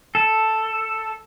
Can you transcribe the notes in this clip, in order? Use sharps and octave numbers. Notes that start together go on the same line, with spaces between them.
A4